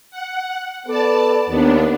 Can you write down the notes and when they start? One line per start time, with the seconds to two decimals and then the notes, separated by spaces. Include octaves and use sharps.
0.11 F#5
0.87 B3 A4 B4 D5 A5
1.49 D#2 B3 D4